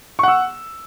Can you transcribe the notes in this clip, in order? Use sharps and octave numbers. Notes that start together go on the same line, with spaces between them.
F#5 C#6 E6